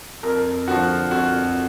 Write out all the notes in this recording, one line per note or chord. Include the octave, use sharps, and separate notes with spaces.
F2 A#4
D3 F3 F#4
F2 F#4